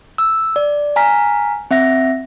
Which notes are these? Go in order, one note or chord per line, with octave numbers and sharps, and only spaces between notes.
E6
D5
G#5 A#5 F6 B6
C4 E5 F#5 A#6